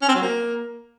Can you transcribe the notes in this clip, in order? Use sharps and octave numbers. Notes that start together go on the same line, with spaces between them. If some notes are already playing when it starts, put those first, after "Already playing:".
C#4
C4
F#3
A#3